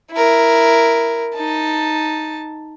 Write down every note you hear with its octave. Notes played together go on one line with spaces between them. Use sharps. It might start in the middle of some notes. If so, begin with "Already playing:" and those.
E4 A#4
D#4 A5